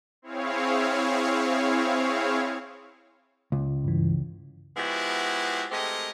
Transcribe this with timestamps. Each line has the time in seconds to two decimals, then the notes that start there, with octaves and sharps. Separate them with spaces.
0.22 C4 E4 G#4 C#5 F5
3.52 C#2
3.84 G2 E3
4.77 F3 G#3 B3 E4 F#4 G4
5.71 G#3 A3 C4 G4 A#4 D#5